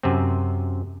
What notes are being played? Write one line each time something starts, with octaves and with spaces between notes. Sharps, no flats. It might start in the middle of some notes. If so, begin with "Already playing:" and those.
F#2 C3 C4